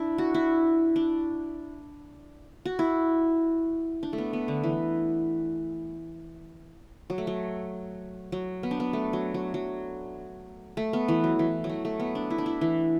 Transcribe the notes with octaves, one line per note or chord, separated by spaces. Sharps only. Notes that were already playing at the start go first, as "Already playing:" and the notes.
Already playing: D4 E4
F#4
E4
D4
F#4
E4
D4
A3
B3
B3
D3
E3
F#3
A3
F#3
F#3
B3
D4
B3
A3
F#3
F#3
F#3
A3
B3
E3
F#3
E3
F#3
A3
A3
B3
D4
E4
D4
E4
E3